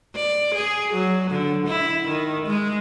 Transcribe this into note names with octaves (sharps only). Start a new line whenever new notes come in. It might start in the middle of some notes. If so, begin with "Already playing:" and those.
D5
G#4
F#3
D3
E4
D#3
G#3